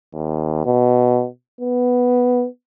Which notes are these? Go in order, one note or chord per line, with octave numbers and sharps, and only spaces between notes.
D#2
B2
B3